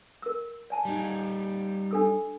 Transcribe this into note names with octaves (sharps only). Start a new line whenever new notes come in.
A#4 E6
D5 G#5 A5
G3 D#4
D4 A4 E6